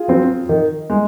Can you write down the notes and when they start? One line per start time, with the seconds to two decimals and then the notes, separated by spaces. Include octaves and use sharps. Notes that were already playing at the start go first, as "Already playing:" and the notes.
Already playing: F4 G#4
0.08 F#3 C4
0.49 D#3
0.90 G#3